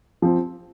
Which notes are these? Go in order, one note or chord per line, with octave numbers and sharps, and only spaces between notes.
F3 C4